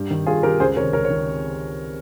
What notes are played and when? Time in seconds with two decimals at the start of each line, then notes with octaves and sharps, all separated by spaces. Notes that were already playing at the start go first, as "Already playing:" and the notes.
Already playing: G2
0.11 D#3
0.27 G2 F4 G#4
0.43 D#3 G4 A#4
0.60 C#2 G#4 C5
0.77 C3 A#4 C#5
0.81 D#3
0.93 C#2 A#4 C#5
1.05 C#5
1.10 D#3